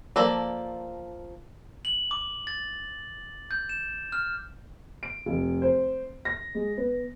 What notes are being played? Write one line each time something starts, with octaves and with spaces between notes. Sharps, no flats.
F3 A#3 A4 D5
F#7
D6
A6
G6
E7
F6
D7
F1
C5
A#6
G#3
B3